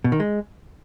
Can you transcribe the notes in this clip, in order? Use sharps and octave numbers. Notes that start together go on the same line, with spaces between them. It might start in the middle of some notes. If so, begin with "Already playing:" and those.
B2
D#3
G#3